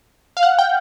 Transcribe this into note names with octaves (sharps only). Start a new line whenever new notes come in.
F5
F#5
G5